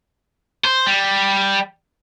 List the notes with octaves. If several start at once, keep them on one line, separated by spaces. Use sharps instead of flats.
C5
G3